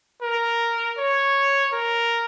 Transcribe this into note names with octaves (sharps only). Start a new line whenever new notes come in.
A#4
C#5
A#4